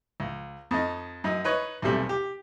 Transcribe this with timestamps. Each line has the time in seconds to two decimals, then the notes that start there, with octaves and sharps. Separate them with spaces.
0.20 C#2
0.71 F2 D#4
1.24 F#2 D#4
1.44 D#4 B4 C#5 C#6
1.82 B1 E2 C3 G3 A3
2.09 G4